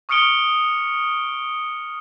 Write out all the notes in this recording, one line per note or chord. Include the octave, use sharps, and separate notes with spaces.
C#6 D#6 F6 C#7 D7 G7